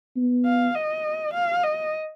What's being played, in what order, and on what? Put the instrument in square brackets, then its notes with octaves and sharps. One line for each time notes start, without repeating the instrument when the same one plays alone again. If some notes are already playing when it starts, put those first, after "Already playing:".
[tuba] B3
[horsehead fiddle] F5
D#5
F5
D#5